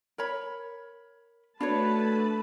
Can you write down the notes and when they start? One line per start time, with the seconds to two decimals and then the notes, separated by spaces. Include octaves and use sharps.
0.18 A#4 C#5 B5
1.60 A3 D4 F#4 B4 C#5 A5 B5